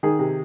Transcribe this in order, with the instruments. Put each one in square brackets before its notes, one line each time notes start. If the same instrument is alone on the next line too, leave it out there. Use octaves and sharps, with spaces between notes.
[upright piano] D#3 G#4
C3